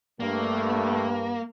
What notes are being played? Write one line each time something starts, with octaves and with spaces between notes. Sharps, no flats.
G2 A3 A#3